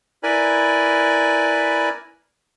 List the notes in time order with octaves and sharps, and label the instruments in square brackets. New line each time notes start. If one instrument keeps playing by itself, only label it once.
[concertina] E4 A#4 B4 D5 G#5 B5